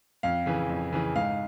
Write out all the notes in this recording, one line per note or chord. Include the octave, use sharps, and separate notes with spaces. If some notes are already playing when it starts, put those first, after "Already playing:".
F2 F5
C#3 E3
F2
C#3 E3
G#2 F5